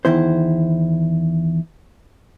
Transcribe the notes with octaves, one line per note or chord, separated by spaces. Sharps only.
E2 D#3 E4 C5